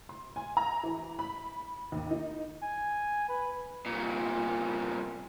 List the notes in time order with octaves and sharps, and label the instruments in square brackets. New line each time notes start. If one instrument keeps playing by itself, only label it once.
[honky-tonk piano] C6
G#5
A#5
E3
B5
D#2
D#4
[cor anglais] G#5
B4
[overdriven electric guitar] C2 A#2